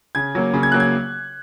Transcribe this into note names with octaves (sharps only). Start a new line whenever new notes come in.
C#3 G#6
F#3 A#3
C#3
G#6
F#3 A#3 F#6
G#6